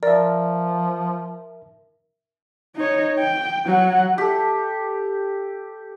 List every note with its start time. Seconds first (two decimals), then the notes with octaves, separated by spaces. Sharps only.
0.03 F3 A#4 D5 E5
2.76 D#4 C#5
3.19 G5
3.65 F#3 F#5
4.18 G4 A4